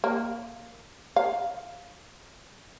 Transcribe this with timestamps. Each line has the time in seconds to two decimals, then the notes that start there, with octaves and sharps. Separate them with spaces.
0.04 A#3
1.16 F5